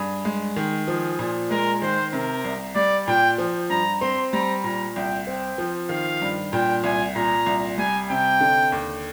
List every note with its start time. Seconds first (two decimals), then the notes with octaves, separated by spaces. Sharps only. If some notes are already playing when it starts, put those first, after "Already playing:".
Already playing: G2 G#4
0.25 G#3
0.56 D#3
0.88 F3 G#4
1.19 A#2
1.51 G#3 A#4
1.82 D#3 C5
2.13 C3 A#4
2.44 C2
2.75 G3 D5
3.08 A#2 G5
3.38 F3
3.70 G2 A#5
4.01 C4 C6
4.33 G3 A#5
4.64 A#2 A#5
4.96 C2 G5
5.27 C4 G5
5.58 F3
5.89 D#3 F5
6.22 G2
6.53 A#2 G5
6.84 C2 G#5
7.15 A#2 A#5
7.46 C2
7.78 G3 G#5
8.10 C3 G5
8.41 D3
8.72 D#2